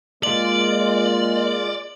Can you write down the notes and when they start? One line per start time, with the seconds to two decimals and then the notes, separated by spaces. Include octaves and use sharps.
0.23 G#3 A#3 F4 D5 F#7